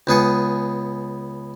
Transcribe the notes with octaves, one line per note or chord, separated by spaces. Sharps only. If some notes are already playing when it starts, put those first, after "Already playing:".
C#2 B3 G#4 C#6